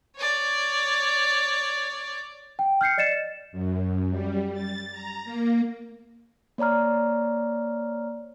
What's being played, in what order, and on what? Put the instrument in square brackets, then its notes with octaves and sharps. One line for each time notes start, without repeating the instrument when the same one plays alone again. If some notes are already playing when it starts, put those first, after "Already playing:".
[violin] C#5 D5
[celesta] G5
F6 G6 C7 C#7
D5 D#5 A6 C#7 E7
[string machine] F#2
G3
A6
A#5
A#3
[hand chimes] A#3 C#5 D5 A#5 F6